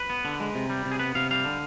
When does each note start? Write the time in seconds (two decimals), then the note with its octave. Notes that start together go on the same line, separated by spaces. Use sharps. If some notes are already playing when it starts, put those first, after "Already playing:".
Already playing: B4
0.10 B3
0.25 D3
0.40 G#3
0.55 C3
0.70 G3
0.85 C3
0.91 G#4
0.99 B3 B4
1.15 C3 F5
1.31 G3 F5
1.45 D3